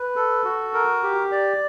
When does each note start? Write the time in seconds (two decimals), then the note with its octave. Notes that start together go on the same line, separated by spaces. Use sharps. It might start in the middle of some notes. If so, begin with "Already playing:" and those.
Already playing: B4
0.16 A4
0.45 F#4
0.74 A#4
1.03 G4
1.32 D5